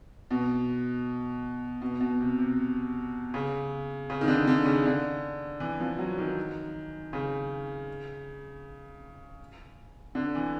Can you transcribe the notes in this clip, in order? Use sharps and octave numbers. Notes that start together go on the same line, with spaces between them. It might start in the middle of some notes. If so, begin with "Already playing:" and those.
B2
B2
B2
C3
C3
C#3
C#3
D#3
D3
D3
C#3
D3
E3
F3
F#3
D#3
C#3
D3
E3